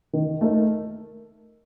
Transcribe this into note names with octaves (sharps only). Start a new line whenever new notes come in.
D#3
A3 D#4 A#4